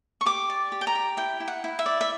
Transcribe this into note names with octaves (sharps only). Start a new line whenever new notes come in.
C#6
G4 D6
D5
G4
G5
A#5
G4
E4 G5
E4
F#5
E4
E5
D5
E5